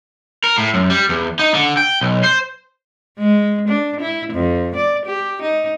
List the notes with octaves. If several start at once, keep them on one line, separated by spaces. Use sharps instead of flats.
A#4
A2
F#2
G3
E2
D#4
D3
G5
B1
C5
G#3
D4
E4
F2
D5
G4
D#4